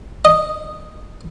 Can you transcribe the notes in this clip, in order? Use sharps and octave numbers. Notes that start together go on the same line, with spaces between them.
D#5